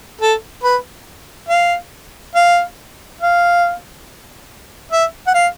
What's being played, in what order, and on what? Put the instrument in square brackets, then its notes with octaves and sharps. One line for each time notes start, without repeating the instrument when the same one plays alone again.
[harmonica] A4
B4
F5
F5
F5
E5
F#5
F5